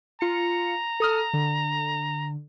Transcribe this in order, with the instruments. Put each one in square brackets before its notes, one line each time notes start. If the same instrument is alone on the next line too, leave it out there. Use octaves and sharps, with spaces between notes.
[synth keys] F4 C#7 [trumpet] A#5
[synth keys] A4 D#6 F6
D3